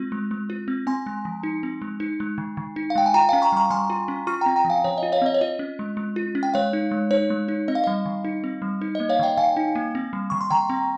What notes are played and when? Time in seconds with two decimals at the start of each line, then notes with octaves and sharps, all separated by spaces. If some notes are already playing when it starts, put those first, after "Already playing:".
Already playing: G#3 C4 F4
0.12 G#3
0.31 G#3
0.50 F4
0.68 C4
0.87 C4 G#5 C6
1.06 G#3
1.25 F3
1.43 D#4
1.63 C4
1.82 G#3
2.00 D#4
2.20 G#3
2.38 D#3
2.57 D#3
2.76 D#4
2.90 F5
2.95 G#3 G5
3.06 G#5
3.14 F4 G5 A#5
3.29 C#4 F5 G#5
3.42 A#5 C#6
3.52 G3 A#5 C#6
3.70 G3 G#5 C6
3.90 F4
4.08 C#4
4.27 F4 C#6 F6
4.41 C4 G5 A#5
4.56 G5 A#5
4.65 F3
4.70 F5 G#5
4.84 F3 C#5
4.98 D#5
5.03 F4
5.12 C#5 F5
5.22 C4 D#5
5.34 C#5
5.41 F4 D#5
5.59 C#4
5.79 G#3
5.97 G#3
6.16 F4
6.35 C#4
6.43 G5
6.54 G#3 C#5 F5
6.73 D#4
6.91 G#3
7.11 D#4 C#5
7.30 G#3
7.48 D#4
7.68 C4 D#5
7.75 F5
7.84 G3 D#5
8.06 D#3
8.24 D#4
8.44 C4
8.62 G3
8.81 D#4
8.95 A#3 D#5
9.09 C#5 F5
9.19 D#3 D#5 G5
9.37 D#3 F5 G#5
9.56 D#4
9.75 A#3
9.95 C4
10.13 G3
10.30 D#3 C#6
10.41 C6
10.50 D#3 G5 A#5
10.70 C4